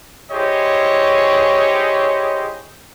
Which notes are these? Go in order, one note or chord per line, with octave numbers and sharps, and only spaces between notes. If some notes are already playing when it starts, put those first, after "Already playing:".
E4 G4 G#4 C5 C#5 D#5